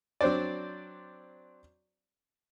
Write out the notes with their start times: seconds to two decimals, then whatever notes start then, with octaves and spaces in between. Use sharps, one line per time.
0.21 F#3 C4 D4 C5 D5